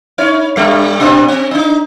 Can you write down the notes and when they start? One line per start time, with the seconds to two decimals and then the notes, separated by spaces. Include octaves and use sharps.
0.18 D#4 C#5
0.56 G2 G3
1.00 A#2 C4 D4
1.28 C4
1.51 D4 D#4